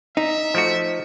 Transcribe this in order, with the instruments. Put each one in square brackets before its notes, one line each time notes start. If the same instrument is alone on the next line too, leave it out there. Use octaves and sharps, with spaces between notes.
[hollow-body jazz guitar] D#4 [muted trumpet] E5
[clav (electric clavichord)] F3 A3 F#4